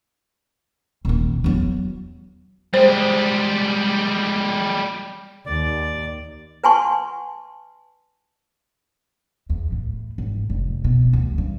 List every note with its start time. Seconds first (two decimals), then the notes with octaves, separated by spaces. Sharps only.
1.05 D#1 D#3
1.44 E2 F#3
2.74 G3 G#3 C5
5.46 D#2 D5
6.64 B4 F#5 G#5 A5 C6 C#6
9.50 E2
9.72 A2
10.18 G#1
10.50 F1
10.84 B2
11.13 D2
11.38 G2